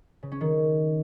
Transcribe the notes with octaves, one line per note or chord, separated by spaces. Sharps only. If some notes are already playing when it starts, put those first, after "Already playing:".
C#3
C#4
D#3